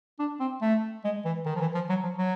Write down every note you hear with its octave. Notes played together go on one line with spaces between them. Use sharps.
D4
C4
A3
G#3
E3
D#3
F3
E3
F3
F#3
F3
F#3